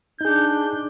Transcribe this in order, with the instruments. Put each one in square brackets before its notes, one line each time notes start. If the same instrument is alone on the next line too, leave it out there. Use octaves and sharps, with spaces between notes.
[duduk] D4 [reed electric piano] D#4 G#4 [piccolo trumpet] G6